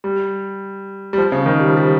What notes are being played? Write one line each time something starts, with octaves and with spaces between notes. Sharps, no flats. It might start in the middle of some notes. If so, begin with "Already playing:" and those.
G3
G3
F3
C#3
D#3
G3
F3
G3